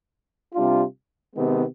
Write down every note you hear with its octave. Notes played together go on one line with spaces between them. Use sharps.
C3 G3 D4 F4
C3 D#3 G#3 B3